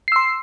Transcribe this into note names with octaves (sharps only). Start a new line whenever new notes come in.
C6 E6 C7